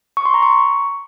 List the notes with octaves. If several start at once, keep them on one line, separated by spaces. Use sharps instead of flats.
C#6
C6
A#5
C#6